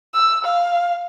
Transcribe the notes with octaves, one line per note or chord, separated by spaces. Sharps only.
E6
F5